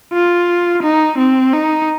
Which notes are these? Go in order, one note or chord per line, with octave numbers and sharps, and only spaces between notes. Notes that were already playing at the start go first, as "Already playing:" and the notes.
F4
D#4
C4
D#4